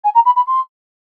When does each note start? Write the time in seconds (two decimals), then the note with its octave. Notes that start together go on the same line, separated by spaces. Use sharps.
0.04 G#5
0.15 A#5
0.25 B5
0.36 B5
0.47 C6